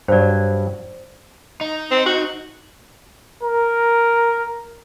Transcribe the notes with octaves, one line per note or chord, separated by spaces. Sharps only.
G2 F#3 C5 D5
D#4
C4
F#4
A#4